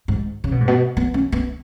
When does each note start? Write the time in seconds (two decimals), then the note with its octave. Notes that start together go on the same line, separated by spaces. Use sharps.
0.08 G#2
0.44 C#3
0.52 B2
0.60 G#2
0.68 B2
0.97 B3
1.14 C#4
1.32 B3